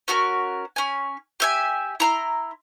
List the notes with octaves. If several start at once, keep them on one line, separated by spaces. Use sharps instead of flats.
C#4 F#4 A4 A#4
C#4 G#5
G4 E5 G#5
E4 A#5 C6